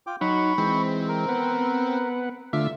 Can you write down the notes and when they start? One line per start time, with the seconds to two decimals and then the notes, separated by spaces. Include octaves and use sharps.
0.07 F4 G5 D6
0.21 F#3 D#4 F#5 B5 C#6
0.58 E3 G#3 C4
1.08 A#4
1.29 B3 B4 F#5
2.53 D3 A3 F4 E5 D6 F6